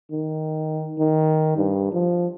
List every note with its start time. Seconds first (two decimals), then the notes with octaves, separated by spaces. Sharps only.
0.11 D#3
0.99 D#3
1.56 G2
1.92 F3